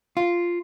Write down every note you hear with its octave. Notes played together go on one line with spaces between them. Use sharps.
F4